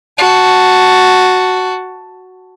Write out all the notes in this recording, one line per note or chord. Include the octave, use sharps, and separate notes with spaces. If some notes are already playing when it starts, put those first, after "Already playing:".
F#4 A5